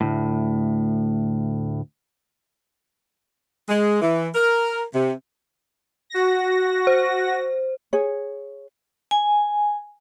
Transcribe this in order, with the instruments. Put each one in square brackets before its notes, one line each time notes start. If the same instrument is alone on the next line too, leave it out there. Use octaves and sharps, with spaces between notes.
[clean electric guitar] D2 A2
[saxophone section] G#3
E3
A#4
C3
[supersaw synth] F#4 A#6
[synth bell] C5
[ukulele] G#4 C#5
[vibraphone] G#5